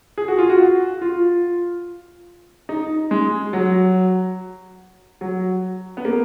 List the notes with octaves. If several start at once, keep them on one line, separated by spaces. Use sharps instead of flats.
G#4
F#4
F4
F#4
F4
D#4
G#3
F#3
F#3
B3
A#3